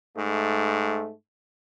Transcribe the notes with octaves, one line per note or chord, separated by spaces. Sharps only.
G#2 A3